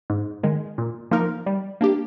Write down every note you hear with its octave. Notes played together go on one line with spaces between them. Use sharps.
G#2
D#3 G#3
A#2
F3 A#3 D#4 A#4
G3
A#3 D4 G4